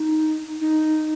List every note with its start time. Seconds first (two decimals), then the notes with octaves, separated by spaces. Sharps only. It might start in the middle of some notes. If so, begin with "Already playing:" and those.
Already playing: D#4
0.61 D#4